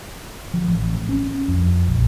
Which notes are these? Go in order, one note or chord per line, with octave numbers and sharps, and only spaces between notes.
F3
A1
C#4
F2
A#1